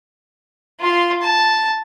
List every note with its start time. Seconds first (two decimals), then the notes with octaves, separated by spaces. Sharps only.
0.80 F4 C6
1.21 A5